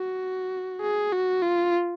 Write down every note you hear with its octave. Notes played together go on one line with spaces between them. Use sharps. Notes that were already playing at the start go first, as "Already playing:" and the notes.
Already playing: F#4
G#4
F#4
F4